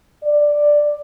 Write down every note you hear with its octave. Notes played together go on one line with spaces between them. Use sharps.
D5